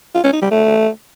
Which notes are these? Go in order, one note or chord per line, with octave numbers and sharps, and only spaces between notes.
F4
C#4
D#4
G3
A3